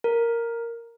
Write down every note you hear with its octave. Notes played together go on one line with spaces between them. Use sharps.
A#4